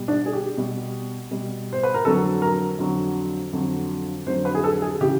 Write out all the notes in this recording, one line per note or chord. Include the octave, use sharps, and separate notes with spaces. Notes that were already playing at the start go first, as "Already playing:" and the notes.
Already playing: B2 G3
D4
G#4
G4
B2 G3
B2 G3
C5
B4
A#4
F2 D3 F#3 A4
A#4
F2 D3 F#3
F2 D3 F#3
F2 D3 F#3 C5
B4
G#4
A4
G#4
C#3 E3 G4